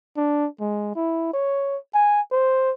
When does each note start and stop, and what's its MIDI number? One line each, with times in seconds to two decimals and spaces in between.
0.17 0.47 62
0.60 0.91 56
0.96 1.32 64
1.33 1.76 73
1.94 2.21 80
2.32 2.72 72